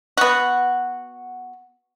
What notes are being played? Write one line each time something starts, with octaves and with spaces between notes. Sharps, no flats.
B3 F#4